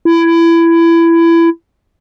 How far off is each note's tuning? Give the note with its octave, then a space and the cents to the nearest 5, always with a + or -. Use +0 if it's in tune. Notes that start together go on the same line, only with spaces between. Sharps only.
E4 +20